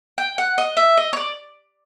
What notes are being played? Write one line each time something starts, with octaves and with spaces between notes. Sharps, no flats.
G5
F#5
D#5
E5
D#5
C#5
D5